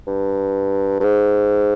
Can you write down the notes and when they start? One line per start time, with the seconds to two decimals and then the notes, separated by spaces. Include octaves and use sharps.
0.07 G2
1.00 G2
1.04 G#2